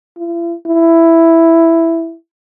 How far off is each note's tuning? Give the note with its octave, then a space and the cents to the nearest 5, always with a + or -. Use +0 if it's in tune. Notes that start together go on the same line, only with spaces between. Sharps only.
E4 +45
E4 +5